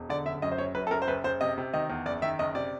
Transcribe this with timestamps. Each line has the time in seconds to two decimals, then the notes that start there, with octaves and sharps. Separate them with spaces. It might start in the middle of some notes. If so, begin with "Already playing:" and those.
Already playing: E1
0.09 D3 D5
0.26 F#1 E5
0.42 F#2 D#5
0.52 C5
0.58 F#1 C#5
0.75 F#2 B4
0.87 A4
0.91 F#1 A#4
1.02 C5
1.08 F#1 B4
1.24 F#1 C5
1.41 C3 D#5
1.58 C3
1.74 D#3 D#5
1.90 E2
2.06 F#1 D5
2.22 D#3 E5
2.39 F#1 D#5
2.55 C3 D5